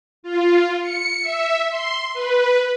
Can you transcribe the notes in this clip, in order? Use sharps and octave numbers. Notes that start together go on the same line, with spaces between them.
F4
C#7
E5
C6
B4